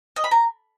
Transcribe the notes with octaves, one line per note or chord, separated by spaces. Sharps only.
D#5
B5
A#5